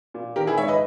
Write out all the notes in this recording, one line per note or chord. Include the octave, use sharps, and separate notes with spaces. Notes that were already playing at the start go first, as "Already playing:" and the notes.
A#2
D#3 G4 A#4
E4 G#4
G#2 C#5 E5
B4 D#5